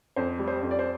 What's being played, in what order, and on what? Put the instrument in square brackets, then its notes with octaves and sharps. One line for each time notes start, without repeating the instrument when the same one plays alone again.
[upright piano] F2 C5
G3
C5
F2
D5
C5